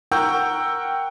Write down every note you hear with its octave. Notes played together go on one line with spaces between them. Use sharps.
A#4 F#5 G5 C#6 E6 G6